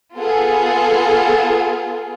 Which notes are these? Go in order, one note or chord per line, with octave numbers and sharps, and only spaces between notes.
B3 F4 G#4 A4